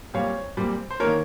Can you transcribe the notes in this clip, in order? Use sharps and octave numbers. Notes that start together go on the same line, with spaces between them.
A#2 G3 C4 C#5 F5
A#2 G3 C4
C5
D#3 A#3 C#4 A#4 C#5